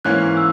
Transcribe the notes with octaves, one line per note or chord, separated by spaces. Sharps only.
G#2 E3 A#3 C#4 F#6
E6